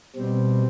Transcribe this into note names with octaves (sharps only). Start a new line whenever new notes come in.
B2 G3 C4